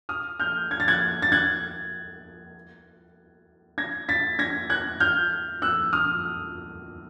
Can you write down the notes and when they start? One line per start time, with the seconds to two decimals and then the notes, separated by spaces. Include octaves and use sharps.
0.09 D#6 F6
0.40 F6 G6
0.71 G#6
0.80 A6
0.88 F#6 G#6
1.22 A6
1.32 F#6 G#6
3.78 G#6 A#6
4.09 A6 B6
4.39 G#6 A#6
4.70 F#6 G#6
5.00 F6 G6
5.62 E6 F#6
5.93 D#6 F6